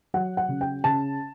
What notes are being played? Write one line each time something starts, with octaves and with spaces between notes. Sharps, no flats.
F#3 F#5
F#5
C#3
G5
C#3 A5